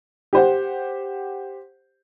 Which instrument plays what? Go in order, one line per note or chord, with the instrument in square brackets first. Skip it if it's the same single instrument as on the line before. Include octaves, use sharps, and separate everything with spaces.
[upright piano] G4 C5 F#5